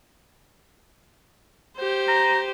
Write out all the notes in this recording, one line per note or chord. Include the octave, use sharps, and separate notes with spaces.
G4 C5
A#5